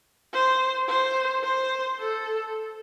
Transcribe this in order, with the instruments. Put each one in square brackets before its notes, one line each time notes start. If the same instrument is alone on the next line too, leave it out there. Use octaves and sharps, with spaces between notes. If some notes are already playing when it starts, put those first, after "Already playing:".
[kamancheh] C5
C5
C5
A4